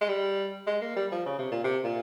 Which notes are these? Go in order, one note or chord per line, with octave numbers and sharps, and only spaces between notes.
G#3
G3
G#3
A#3
G3
F3
C#3
C3
A#2
C3
A#2